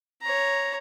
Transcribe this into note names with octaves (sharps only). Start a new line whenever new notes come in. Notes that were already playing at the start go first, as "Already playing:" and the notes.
C#5 A#5